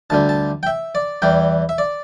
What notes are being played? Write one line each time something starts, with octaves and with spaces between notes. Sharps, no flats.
D2 D3 G3 A5
A5
G5
E5
D5
E2 E3 G3 G5
E5
D5